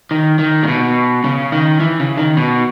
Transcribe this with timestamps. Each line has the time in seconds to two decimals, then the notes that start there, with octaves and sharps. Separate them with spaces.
0.11 D#3
0.39 D#3
0.63 A#2
0.68 B2
1.24 C#3
1.52 D#3
1.80 E3
2.00 C#3
2.18 D#3
2.37 B2